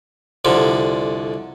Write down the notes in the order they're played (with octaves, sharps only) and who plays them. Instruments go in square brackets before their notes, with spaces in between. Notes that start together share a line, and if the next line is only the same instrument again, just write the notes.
[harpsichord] C2 F2 D3